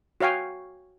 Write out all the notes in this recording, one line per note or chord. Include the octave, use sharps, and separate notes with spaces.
F#4 C#5 F5 G5 G#5